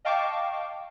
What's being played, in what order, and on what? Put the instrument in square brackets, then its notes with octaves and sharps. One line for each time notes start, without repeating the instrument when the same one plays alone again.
[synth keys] D#5 F5 G5 A5 C#6 D6